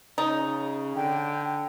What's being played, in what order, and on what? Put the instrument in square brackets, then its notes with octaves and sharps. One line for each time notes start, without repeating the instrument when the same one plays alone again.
[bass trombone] C#3 [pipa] D#4
[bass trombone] D3 [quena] G5